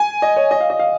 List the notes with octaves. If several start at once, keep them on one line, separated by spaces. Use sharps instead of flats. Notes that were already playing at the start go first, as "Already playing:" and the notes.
Already playing: G#5
D#5
C#5
D#5
F5
D#5
F5